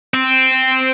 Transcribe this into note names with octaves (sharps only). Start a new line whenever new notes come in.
C4